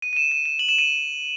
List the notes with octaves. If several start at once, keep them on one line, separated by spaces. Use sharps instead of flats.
D#7
D#7
E7
D#7
E7
F#7
E7
D#7